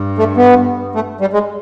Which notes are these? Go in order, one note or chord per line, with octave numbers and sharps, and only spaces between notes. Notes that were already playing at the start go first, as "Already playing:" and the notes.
Already playing: G2
A3
B3
A3
G3
G#3